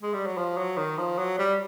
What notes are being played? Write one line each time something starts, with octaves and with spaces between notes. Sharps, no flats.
G#3
G3
F#3
F3
F#3
D#3
F3
F#3
G3